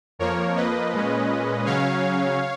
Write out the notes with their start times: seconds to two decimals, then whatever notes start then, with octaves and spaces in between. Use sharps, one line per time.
0.19 F2 F3 A#3 A#4 C#5
0.56 B4 D#5
0.92 A#2 G#3 C#4
1.66 C#3 F#3 C#4 C#5 F5